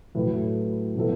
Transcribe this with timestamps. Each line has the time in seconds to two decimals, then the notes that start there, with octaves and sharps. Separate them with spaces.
0.15 A2 F#3 A3 E4 B4
0.95 A2 F#3 B3 E4 A4